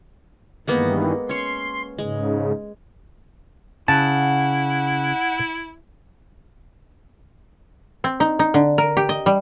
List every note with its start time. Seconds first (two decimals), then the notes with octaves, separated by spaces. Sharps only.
0.67 G2 D#3 E3 G#3 A#3 B3
1.29 C#4 C#5 C6
1.98 G#2 C#3 G#3
3.88 C#3 E4 F#5 A5
8.04 C4
8.20 D#4
8.39 D#4
8.54 D3
8.78 A#4
8.97 G4
9.09 D#5
9.26 G3